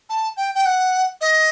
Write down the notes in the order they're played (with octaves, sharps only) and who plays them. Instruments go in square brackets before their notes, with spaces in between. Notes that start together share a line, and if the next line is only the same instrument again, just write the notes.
[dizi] A5
G5
G5
F#5
D#5